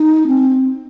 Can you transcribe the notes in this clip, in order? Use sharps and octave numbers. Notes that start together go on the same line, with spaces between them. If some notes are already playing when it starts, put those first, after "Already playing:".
Already playing: D#4
C4